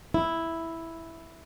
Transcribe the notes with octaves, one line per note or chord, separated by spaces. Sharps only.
E4